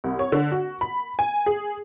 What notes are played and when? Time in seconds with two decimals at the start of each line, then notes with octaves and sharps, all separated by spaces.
0.04 C2
0.19 C#5
0.32 D3
0.52 F#4
0.81 B5
1.19 G#5
1.46 G#4